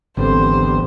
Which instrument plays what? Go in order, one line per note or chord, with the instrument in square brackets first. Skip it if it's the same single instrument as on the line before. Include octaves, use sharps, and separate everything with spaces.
[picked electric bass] G#1 [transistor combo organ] D2 G3 B3 [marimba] E3 C4 A4 [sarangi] C5